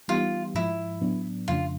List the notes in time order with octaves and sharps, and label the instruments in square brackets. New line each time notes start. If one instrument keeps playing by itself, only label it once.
[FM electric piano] E3 G3 B3 D#4 G4 [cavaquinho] F4
[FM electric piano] G#2 F3 G#3 [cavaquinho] E4
[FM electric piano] A2 F#3 B3 D4
[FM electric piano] F2 C#3 F3 A3 D4 [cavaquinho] F4